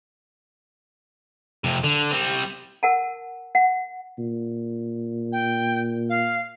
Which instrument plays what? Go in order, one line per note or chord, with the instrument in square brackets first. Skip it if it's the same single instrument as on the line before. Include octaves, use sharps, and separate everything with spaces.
[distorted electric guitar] F2 C3
D3
G3 C4
[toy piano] A#4 F#5 A5
F#5
[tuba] A#2
[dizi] G5
F5